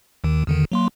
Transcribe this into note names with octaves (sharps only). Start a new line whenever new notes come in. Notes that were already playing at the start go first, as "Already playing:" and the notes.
D#2 D#3
E2 D3 D#3
F#3 A#3 C6